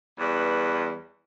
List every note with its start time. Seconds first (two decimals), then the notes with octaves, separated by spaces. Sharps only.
0.19 E2 G3 B4